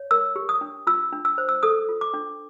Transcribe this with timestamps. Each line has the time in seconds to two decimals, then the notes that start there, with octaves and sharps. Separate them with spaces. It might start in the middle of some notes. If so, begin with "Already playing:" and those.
Already playing: C#5
0.11 A#4 E6
0.36 G4
0.49 D#6
0.61 D4
0.87 F4 E6
1.12 D4
1.25 E6
1.38 C5
1.49 E6
1.63 A4 D#6
1.89 F4
2.01 D6
2.14 D4